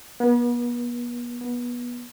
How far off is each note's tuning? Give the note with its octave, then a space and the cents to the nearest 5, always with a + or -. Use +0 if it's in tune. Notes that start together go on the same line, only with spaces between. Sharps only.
B3 -40
B3 -25